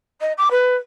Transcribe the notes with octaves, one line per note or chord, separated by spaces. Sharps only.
D#5
D6
B4